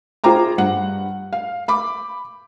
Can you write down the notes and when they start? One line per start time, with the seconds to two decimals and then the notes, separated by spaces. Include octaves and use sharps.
0.24 F4 G#4 C5 G5 A#5 D6
0.58 G2 F#5
1.33 F5
1.68 B5 D6